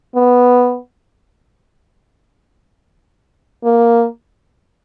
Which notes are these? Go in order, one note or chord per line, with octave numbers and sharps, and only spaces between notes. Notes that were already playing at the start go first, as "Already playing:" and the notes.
B3
A#3